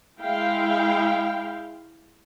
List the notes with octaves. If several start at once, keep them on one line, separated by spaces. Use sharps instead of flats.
G#3 E4 F5 G5